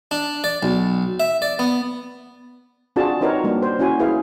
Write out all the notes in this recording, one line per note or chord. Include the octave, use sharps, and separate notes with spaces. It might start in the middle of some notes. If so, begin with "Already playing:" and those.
D4
D5
B1
E5
D5
B3
C4 D4 F4 F#4 G#4 A5
C4 D#4 F#4 A#4 B4 C#5
G3 A#3 D4
C5
C#4 E4 F#4 G#5
E4 G#4 B4 F5